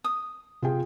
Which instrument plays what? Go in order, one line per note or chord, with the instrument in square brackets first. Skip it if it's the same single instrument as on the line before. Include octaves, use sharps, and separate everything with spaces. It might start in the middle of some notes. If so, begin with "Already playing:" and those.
[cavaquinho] D#6
[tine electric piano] C3 [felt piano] F4 G#4 G5